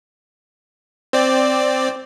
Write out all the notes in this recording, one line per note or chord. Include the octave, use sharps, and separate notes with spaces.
C4 D5